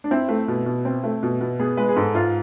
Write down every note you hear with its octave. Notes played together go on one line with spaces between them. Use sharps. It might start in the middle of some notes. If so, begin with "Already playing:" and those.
D4
C4 E4
A3
B2
B2
C4
A3
B2
B2
B3 G#4
G#3 B4
G#4
G#2 A4
G#2 F4